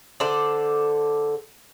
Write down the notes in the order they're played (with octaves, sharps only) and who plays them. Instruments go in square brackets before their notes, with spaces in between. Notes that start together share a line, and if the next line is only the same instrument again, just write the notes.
[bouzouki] D3 A4 C5 D5